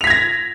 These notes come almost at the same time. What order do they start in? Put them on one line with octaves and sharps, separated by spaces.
F7 B6 G#6 A#6